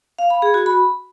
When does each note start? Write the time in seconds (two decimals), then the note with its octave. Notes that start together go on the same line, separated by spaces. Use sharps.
0.19 F5
0.30 B5
0.42 G#4
0.54 F#4
0.66 B5